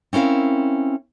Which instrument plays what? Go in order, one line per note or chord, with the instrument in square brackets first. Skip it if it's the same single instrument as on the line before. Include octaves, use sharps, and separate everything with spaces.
[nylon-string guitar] C4 C#4 E4 A#4 F5